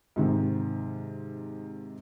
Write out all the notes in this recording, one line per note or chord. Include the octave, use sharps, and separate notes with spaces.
G#2 C3 D#3